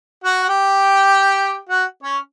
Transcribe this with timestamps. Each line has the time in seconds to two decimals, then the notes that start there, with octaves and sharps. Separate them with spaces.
0.24 F#4 F#5
0.43 F#5
0.49 G4 G5
1.70 F#4 F#5
2.03 C#4 C#5